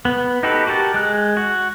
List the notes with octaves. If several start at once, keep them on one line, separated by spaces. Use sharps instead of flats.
B3
D#4 F#4 G4 A4 B4
F#4 G4 A#4 A5
G#3 F#6
F#4